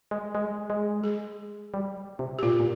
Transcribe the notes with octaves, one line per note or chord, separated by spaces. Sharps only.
G#3
G#3
G#3
G#4
G3
C3
G4
A#2 F4
A#2